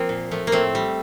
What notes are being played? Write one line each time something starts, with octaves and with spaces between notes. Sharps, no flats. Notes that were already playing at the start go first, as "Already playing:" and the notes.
Already playing: F3 A#3 C4
A#2
F3 A3
A#3
A2 A3 C4
G3